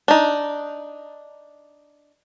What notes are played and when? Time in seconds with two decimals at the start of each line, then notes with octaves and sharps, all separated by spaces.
0.08 D4 D#4